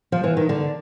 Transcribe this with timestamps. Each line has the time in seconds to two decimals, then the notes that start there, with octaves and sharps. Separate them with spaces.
0.12 F3
0.24 E3
0.37 D#3
0.49 D3